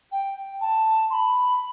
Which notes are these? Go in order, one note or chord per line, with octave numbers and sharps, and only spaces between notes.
G5
A5
C6
B5